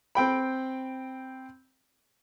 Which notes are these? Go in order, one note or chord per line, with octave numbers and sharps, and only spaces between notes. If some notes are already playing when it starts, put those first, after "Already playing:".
C4 G5 B5